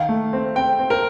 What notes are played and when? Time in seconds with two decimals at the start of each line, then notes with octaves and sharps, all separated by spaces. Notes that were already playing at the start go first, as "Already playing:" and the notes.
Already playing: D#3 F5
0.09 A3
0.33 C4
0.55 C4 G5
0.79 C4
0.90 A#4